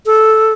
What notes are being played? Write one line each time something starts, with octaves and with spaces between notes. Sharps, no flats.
A4